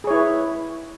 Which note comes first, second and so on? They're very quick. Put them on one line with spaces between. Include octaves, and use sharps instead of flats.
G#4 C#5 E4 B4